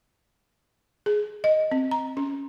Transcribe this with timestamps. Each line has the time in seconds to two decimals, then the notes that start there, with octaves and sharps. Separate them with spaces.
1.06 G#4
1.44 D#5
1.71 C4
1.91 A#5
2.17 C#4